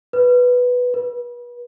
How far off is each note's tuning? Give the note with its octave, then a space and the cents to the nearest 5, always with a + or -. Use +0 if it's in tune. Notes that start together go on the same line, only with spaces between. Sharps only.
B4 +0
B4 -35